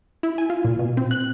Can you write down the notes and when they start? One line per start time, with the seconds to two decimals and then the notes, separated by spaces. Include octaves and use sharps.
0.23 E4
0.38 G#5
0.50 F4
0.65 A#2
0.79 B2
0.97 C4
1.11 F#6